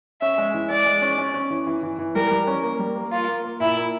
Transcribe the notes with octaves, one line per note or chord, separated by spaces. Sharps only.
C#4 E5
G#3
E3
G#3 D5
G#3
C#4
C#4
C#4
E3
E3
E3
E3
G3 A#4
G3
C#4
A#3
G3
A#3
A#3 F4
A#3
A#3
A#2 E4
A#3